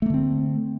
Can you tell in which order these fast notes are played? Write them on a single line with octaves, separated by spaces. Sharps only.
A3 A#3 D3 C4